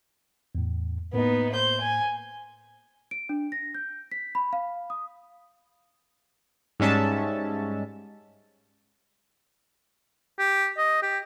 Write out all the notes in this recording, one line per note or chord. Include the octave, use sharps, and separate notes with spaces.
E2 A2
A2 A#3 B3 D#4
C5 G6
G#5
D7
D4
A#6
G6
B6
B5
F5
D#6
G#2 G3 G#3 C#4 E5 A5
G4
D#5
G4